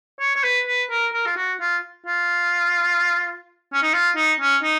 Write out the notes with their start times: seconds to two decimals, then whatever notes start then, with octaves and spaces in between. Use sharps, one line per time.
0.20 C#5
0.36 C#5
0.44 B4
0.67 B4
0.90 A#4
1.13 A#4
1.26 F4
1.36 F#4
1.60 F4
2.06 F4
3.73 C#4
3.83 D#4
3.94 F4
4.16 D#4
4.40 C#4
4.63 D#4